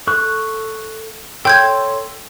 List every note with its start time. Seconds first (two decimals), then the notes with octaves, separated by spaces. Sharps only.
0.07 A4 C#6 F#6
1.45 A4 C#5 G5 C6 G6 G#6